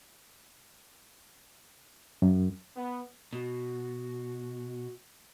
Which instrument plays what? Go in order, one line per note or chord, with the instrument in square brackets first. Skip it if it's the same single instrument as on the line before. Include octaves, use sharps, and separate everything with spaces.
[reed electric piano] F#2
[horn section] B3
[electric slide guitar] B2 [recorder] F#4